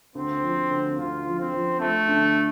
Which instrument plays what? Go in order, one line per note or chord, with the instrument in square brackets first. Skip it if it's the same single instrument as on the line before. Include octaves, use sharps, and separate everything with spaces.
[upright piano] D2 [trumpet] C4
[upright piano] F3
D2
[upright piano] D2 [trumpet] F4
[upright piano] F3
[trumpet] C4
[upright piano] F3
[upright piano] F3 [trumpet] A3
[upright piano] D3